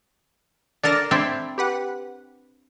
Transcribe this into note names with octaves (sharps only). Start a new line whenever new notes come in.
D4 A4 A#4 D5 A5 A#6
C4 D4 E4
G4 B4 F#5